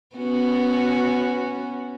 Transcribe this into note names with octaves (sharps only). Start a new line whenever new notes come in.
B3 C#4 F#4